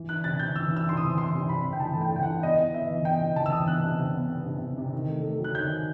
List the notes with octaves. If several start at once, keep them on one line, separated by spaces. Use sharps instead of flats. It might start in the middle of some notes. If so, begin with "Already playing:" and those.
Already playing: E3
E4 F#6
C3 A6
C3 G6
E3 E6
E4 E6
C3 C6
D#6
E3
E3 C6
C3
E4 B5
C3
G5
E3 A5
A3
G5
E3 G5
F#5
E4
B3 D#5
B3
B3 E5
E3
B3 G5
C3
E3 A5
E6
E3 D#6
B3 F#6
C3
C3
B3
B3
C3
C3
C3
D#3
A3
A3
F#3
F#6
D#3 G6
D#3